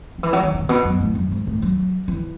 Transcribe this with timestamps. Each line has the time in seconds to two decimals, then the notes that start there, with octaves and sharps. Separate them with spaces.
0.18 D#3
0.23 E3
0.33 F#3
0.43 D#3
0.54 D#3
0.63 A2
0.69 B2
0.85 F#2
1.01 A2
1.15 F#2
1.32 G#2
1.47 A2
1.62 F#3
2.08 E3